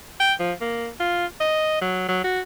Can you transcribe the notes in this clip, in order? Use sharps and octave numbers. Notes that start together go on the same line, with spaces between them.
G5
F3
A#3
F4
D#5
F#3
F#3
F#4